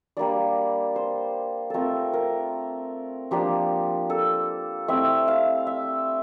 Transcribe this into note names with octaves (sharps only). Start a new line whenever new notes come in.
G3 A#3 D4 D5
C5
A3 C4 F4 A4 A#4
A#4
F3 A#3 D4 G4
A4
A3 C4 E4 E5
F5
E5